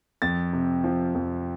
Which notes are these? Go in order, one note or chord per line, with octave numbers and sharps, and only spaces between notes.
F2 A6
C3
F3
F2